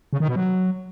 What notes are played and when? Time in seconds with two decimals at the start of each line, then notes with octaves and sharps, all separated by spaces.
0.13 C#3
0.20 D#3
0.28 B2
0.36 F#3